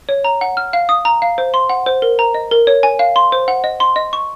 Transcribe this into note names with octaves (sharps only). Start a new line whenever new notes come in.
C#5
A#5
F#5
F6
F5
D#6
A#5
F5
C5
C6
F#5
C5
A#4
A#5
D#5
A#4
C#5
G#5
F5
C6
C5
F#5
D#5
C6
D#5
C#6